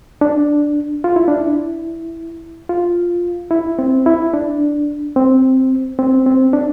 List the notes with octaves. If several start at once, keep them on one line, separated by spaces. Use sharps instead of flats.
D4
F4
E4
D4
E4
F4
E4
C4
E4
D4
C4
C4
C4
D4